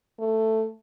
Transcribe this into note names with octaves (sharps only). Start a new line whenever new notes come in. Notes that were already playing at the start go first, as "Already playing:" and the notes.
A3